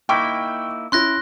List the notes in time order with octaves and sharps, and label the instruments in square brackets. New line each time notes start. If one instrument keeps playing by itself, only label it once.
[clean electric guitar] A#3 D#4 E4 [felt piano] G5 C#6 D6
[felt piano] C#4 E4 [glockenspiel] C6 F#6 A#6